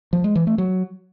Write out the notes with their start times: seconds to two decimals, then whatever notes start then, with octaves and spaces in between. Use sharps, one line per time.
0.13 F3
0.24 G#3
0.36 E3
0.47 A3
0.58 F#3